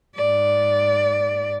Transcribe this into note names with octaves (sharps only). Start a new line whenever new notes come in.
G#2 D5